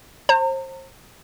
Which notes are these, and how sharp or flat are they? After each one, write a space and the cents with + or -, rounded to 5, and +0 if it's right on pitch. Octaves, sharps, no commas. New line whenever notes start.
C5 +30 A#5 -40